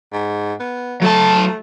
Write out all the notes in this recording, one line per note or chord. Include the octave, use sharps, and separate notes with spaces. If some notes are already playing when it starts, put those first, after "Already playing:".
G#2
B3
F#3 A3 A5